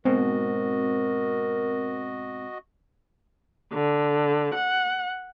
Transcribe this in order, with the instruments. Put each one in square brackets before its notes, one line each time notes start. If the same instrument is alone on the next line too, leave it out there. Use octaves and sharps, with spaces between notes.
[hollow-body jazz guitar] G#2 B2 [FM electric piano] C4 [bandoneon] F#4 D#5 [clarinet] A#4
[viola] D3
F#5